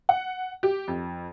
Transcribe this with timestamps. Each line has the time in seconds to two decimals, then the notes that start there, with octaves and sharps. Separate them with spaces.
0.09 F#5
0.63 G4
0.88 F2